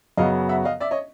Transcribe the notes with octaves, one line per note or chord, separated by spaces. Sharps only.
F#2 C#3 F#3 B3 D#5 F5
E5 F#5
D#5 F5
D5 E5
C#5 D#5